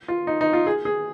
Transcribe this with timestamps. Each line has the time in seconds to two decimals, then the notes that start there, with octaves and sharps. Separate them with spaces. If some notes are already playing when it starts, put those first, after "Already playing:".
0.08 F4
0.27 D#4
0.41 D#4
0.53 F4
0.67 G#4
0.85 G#4